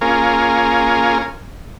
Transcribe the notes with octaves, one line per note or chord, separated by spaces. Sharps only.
A#3 C#4 F4 G#4 A#4